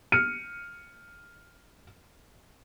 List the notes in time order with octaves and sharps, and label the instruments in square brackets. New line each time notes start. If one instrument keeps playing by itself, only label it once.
[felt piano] F6 C#7 D#7